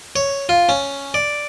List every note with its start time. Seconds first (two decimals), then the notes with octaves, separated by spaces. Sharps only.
0.16 C#5
0.49 F4
0.69 C#4
1.14 D5